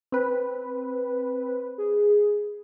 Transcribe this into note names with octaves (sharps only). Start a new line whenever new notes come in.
C4 B4
G#4